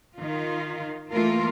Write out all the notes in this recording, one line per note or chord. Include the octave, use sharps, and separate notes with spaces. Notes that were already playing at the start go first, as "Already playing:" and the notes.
D#3 F4
E3 A3 A#3 F4 A#4